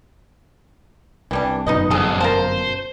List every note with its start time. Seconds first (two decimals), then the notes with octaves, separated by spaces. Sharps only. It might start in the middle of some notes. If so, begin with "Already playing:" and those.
1.31 C2 E3 G3 D4
1.67 G1 F#2 B2 D#4 B4 D#5
1.91 F2 D3 G#4 A4
2.20 A#4 C5 F5 A5